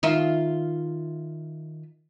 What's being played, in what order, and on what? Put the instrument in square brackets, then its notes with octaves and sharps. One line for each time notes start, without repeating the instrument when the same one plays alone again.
[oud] D#3 F4 E5